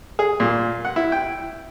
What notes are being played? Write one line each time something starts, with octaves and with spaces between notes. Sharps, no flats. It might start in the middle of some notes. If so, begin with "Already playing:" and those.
G#4
A#2
F#5
E4
G5